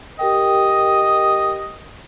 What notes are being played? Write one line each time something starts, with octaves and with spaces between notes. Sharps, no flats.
G4 A#4 D#5 G5